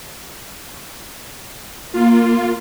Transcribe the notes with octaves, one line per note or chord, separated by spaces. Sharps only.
A#3 F4